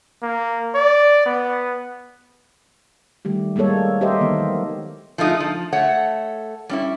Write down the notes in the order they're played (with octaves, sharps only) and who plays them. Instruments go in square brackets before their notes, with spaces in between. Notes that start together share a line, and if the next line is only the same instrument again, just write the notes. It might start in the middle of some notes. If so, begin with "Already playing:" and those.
[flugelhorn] A#3
D5
B3
[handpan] D#3 G3 A3 G4
G3 G#3 A#3 A4 C#5
G4 A#4 C5 D#5 E5
D#3 E3 A#3 B3
F#3
[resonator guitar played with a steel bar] F3 G#3 A3 D#4 F4
F3
A3 C#5 F#5
G3 C#4 E4